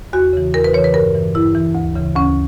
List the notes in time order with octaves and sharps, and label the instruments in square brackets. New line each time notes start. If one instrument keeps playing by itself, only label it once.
[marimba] E2 F#4
C#3 E3
E2 A#4
B4
E3 C#5
C#3
B4
G2 A#4
E3
G2 E4
E3
D2
C#3 E3
D2 C#4